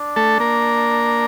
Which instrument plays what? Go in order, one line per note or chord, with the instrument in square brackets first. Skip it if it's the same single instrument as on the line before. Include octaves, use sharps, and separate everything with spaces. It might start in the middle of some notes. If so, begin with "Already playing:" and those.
Already playing: [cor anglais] D4
[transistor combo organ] A3 A4
A#3 A#4